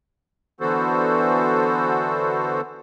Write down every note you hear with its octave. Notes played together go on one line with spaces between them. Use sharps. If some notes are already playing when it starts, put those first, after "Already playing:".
D3 E3 B3 F#4 A4 C5